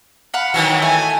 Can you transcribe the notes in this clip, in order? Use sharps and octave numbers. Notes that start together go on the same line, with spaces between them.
F5 F#5 B5
D#3 E3 F#3
A3 G#5